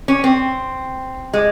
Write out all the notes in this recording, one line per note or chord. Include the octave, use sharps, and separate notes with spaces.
C#4
C4
G#3